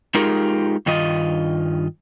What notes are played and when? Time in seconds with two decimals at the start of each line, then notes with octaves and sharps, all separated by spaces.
0.14 G#3 D#4 F4 G4 G#4 A#4
0.86 G2 D#3 F4 D#5